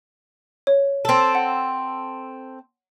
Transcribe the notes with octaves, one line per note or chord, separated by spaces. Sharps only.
C#5
C4 A4
F#5